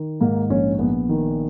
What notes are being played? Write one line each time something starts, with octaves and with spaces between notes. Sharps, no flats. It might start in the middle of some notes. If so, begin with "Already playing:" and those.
Already playing: D#3
G#2 A#3
A#1 C#4
A#1 B3
D#3